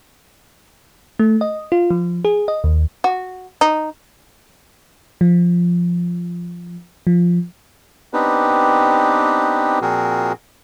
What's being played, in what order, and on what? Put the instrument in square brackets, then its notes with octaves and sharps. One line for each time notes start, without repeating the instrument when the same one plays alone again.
[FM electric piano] A3
D#5
F4
F3
G#4
D#5
D#2
[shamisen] F#4
D#4
[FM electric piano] F3
F3
[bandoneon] B3 C4 D4 D#4 G4 B4
A#2 F3 C4 F#4 G#4 A#4